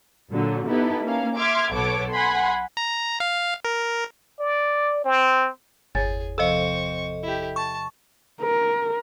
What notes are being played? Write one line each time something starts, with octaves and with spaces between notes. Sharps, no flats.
A#2 D3 F#3
B3 D#4 E4 G4 A4 B4
A#3 C#4 F5
E5 C6 D6 F6 G#6
B1 B3 A4 C#5 D6
F#5 G#5 B5 C6
A#5
F5
A#4
D5
C4
G1 E2 G#4 C#5 A6
C3 F3 C4 A4 D#5 C#6
E4 G4
A5 C#6
A#4